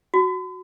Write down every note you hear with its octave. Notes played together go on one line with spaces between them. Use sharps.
F#4